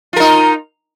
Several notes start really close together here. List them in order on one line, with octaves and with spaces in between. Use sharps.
F4 A#4 D#4